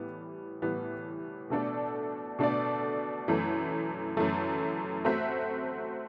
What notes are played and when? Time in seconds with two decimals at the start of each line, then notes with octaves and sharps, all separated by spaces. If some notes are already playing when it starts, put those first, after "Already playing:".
Already playing: A2 E3 G3 B3
0.62 A2 E3 G3 B3
1.50 B2 A3 D4 A4 D5
2.39 B2 A3 D4 A4 D5
3.28 F#2 E3 A3
4.17 F#2 E3 A3
5.05 A3 C4 F#4 C5 E5